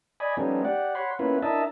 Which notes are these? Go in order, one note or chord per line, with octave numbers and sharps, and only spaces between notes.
D5 D#5 G#5 B5
F3 G3 A3 B3 C#4 D#4
G4 D5 F#5
C#5 F#5 B5 C6
A#3 B3 C#4 E4 F4 B4
D4 E4 A#4 D#5 E5 A5